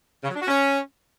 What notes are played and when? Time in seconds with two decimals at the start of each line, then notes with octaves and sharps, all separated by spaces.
0.24 C#3
0.30 F#3
0.36 D4
0.42 F#4
0.47 C#4